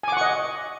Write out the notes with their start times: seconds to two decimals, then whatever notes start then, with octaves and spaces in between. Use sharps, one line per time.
0.03 G#5
0.08 D6
0.12 F#5
0.17 C#6
0.21 D#5